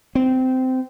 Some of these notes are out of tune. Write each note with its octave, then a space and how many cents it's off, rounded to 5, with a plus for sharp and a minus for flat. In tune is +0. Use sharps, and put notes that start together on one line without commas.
C4 -20